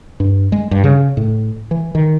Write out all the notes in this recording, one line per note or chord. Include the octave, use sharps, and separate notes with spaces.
G2
G#3
G2
C#3
A2
E3
D#3